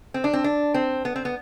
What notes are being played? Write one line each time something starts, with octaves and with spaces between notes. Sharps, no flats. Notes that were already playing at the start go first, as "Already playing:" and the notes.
C4
D4
C4
D4
C4
B3
C4
B3